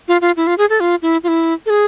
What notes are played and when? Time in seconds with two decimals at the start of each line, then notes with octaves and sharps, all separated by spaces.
0.08 F4
0.21 F4
0.37 E4
0.47 F4
0.58 G#4
0.70 A4
0.80 F4
1.02 E4
1.23 F4
1.28 E4
1.66 A4
1.70 G#4